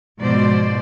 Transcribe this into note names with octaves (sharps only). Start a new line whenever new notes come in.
G#2 B2 F3 C5 D5